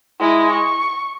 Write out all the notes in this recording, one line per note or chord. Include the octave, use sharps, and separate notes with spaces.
G#3 E4
C#6